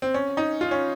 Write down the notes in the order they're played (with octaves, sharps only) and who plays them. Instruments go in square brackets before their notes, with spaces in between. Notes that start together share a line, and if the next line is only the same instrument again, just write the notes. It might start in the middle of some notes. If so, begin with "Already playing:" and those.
[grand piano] C4
C#4
D#4
F4
C#4